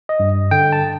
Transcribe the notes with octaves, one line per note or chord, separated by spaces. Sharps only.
D#5
G2
D3 G5
A5